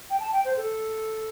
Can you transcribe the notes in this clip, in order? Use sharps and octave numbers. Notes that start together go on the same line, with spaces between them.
G5
A5
G5
C5
A4